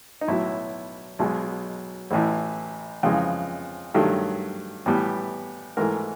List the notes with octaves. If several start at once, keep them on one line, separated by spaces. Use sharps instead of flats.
D#4
B1 A2 F#3 E4
B1 B2 G#3
A1 A2 E3 E4
F2 C#3 E3 G#3
G2 D#3 F#3 A3
A2 E3 G3 B3
G#2 E3 A3 A#4